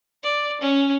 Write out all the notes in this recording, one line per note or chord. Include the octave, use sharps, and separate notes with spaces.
D5
C#4